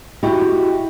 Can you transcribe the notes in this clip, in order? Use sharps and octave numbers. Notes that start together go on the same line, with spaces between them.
E4 F#4 G4 D#5